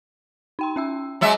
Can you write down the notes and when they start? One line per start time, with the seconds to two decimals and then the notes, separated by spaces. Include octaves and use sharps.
0.59 D#4 G5 C6
0.76 C#4 E5 E6
1.21 F#3 G#3 E5 A#5 D6